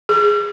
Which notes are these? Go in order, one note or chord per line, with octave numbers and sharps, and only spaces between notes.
G#4